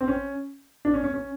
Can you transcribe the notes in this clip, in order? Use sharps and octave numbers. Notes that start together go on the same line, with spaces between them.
C4
C#4
D4
C#4
C#4
C#4